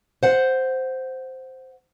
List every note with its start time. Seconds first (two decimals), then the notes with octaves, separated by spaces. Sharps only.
0.23 C5 F#5